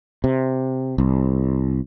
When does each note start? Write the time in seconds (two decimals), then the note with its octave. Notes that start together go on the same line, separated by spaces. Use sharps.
0.24 C3
0.98 C2